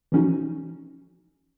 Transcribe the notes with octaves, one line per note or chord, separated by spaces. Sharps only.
E3 F3 C#4 D#4 F#4